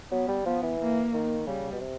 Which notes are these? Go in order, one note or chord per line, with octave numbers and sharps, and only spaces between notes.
F#3 B3
G3
F3 B3
E3
A#3
D#3
C#3 G3
B2
C3